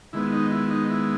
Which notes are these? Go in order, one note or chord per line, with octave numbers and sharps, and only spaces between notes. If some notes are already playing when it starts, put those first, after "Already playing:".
D#3 G#3 B3 E4
D#4
E4
D#4
E4